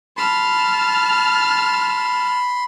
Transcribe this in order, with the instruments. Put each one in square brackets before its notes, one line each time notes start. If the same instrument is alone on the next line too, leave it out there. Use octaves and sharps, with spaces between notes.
[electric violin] A5 F6 [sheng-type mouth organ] B5 C6